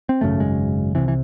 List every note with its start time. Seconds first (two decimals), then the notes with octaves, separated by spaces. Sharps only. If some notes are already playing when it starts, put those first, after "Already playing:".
0.09 C4
0.21 G#1 F#2 C#3 A3
0.40 G#3
0.95 C2 C3 E3
1.08 E3